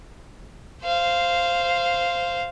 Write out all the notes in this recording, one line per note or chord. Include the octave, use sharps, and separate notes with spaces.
C5 F5